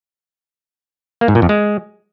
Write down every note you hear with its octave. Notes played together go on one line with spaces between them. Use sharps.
A#3
G#2
A#2
F2
G#3